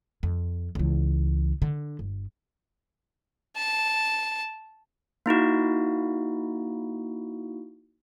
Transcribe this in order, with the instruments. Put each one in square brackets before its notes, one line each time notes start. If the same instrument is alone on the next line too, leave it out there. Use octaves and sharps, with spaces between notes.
[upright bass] F2
C#2 E3
D3
G1
[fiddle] A5
[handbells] A#3 D#4 E4 F#4